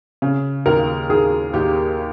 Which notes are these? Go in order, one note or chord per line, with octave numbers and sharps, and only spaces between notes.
C#3
D#2 A#4
D#2 G#4
D#2 G4